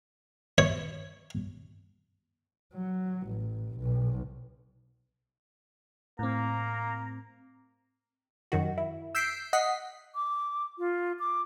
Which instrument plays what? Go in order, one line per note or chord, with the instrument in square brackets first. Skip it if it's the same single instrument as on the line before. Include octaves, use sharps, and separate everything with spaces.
[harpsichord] C#5
[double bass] F#3
A1
B1
[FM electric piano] A2 C4 [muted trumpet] A#3 [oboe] A#5
[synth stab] F#2 D#3 F#4
E4
E6 G6 B6 C7 D7
D#5 F#5 B6 C7
[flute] D6
F4
D6